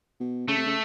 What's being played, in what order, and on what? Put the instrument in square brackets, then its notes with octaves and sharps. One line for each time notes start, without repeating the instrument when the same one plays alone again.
[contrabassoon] B2
[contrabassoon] C#3 [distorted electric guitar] A3
[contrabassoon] C3
C#3